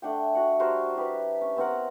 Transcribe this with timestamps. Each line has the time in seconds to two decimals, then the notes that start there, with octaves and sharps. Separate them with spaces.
0.02 A3 D4 F#5 G5
0.35 F#4 F#5
0.59 G3 F#4 A#4 C5
0.95 E4 G4 B4
1.41 C#4
1.56 B3 C4 A#4 F#5